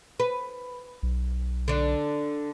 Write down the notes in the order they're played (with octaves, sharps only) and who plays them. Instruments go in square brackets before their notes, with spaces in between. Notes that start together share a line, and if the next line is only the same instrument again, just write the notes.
[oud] B4
[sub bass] B1
[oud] D3 D4